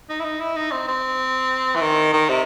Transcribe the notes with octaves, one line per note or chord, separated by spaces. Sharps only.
D#4
E4
D#4
E4
D#4
C4
C4
E3
D#3
D#3
C3